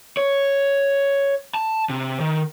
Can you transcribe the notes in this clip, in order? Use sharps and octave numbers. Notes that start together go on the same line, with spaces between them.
C#5
A5
C3
D#3